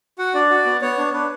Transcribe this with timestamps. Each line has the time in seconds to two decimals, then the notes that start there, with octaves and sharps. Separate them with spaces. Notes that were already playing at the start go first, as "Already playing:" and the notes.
0.19 F#4 F#5
0.34 D4 D5
0.50 F#4
0.66 B3
0.82 B3 C#5
0.98 D4
1.13 D4 B4